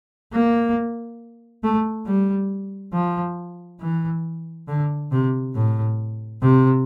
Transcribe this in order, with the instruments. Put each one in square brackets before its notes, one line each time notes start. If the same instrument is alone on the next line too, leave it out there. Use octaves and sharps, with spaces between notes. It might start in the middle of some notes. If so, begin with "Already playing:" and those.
[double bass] A#3
A3
G3
F3
E3
D3
C3
A2
C3